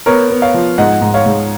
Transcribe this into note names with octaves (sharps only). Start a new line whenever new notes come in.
B3 A#4 C#5
B3
C#5 F5
F3
G#2 D#5 F#5
G#2
C#5 F5
G#2